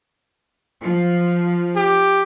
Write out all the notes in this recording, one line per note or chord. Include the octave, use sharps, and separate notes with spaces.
F3
G4